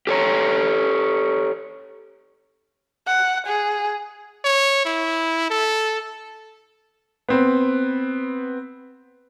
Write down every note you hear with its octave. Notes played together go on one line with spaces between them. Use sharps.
G4 A4 C#5 A#5
F#5
G#4
C#5
E4
A4
B3 C4 B4